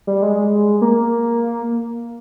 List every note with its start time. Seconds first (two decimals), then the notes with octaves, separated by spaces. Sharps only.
0.07 G3
0.22 G#3
0.82 A#3